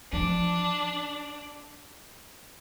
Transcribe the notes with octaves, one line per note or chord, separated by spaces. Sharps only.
F3 D4